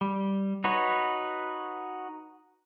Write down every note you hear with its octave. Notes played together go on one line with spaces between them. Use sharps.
G3
D#4 F#4 B4 C#5